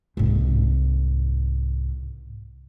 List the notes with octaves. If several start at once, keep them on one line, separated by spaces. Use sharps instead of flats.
C2 G#2